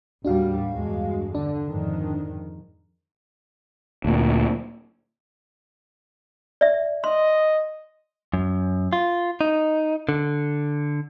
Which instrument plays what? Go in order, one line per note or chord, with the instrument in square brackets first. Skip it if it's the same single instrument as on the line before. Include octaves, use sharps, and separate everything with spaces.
[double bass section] D#2 A2 G3 [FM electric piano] D4 F#4 F5
[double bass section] E2 G2 G#3
[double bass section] D3 [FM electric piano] D4
[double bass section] F2 G#2 D#3
[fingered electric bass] D2 A#2
[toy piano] D5 E5
[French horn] D#5 [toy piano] C6
[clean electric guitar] F#2
F4
D#4
D3